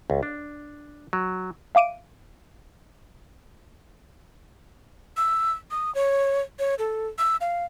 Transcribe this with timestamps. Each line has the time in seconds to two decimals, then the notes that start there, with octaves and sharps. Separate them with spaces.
0.10 C#2
0.23 D4
1.13 F#3
1.75 E5 F5 D6 D7 D#7
5.17 E6
5.71 D#6
5.95 C#5
6.59 C#5
6.79 A4
7.18 E6
7.41 F5